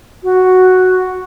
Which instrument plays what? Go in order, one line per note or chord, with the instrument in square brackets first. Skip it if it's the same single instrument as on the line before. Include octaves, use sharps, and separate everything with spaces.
[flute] F#4